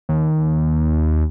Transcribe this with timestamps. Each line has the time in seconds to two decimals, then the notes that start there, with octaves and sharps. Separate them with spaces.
0.09 D#2